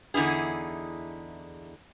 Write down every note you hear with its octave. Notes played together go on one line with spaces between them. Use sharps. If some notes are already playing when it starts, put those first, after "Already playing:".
E2 D3 D#4 E4 G#4